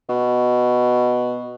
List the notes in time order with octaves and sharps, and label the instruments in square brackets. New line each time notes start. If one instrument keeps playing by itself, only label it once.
[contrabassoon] B2